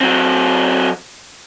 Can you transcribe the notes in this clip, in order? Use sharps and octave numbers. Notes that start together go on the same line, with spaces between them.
F#3 C4